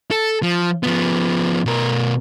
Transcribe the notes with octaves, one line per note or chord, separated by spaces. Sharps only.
A4
F3
F3 B3
B2 A#4